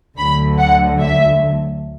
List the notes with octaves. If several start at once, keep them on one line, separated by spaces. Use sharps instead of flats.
D2 D3 F#3 B5
F#5
E5